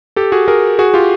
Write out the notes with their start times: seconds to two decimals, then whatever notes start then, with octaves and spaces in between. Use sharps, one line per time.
0.16 G4 A4
0.32 F#4 G#4
0.48 G#4 A#4
0.79 F#4 G#4
0.94 F4 G4